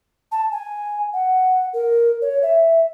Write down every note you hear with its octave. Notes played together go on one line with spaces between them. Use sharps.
A5
G#5
F#5
A#4
C#5
E5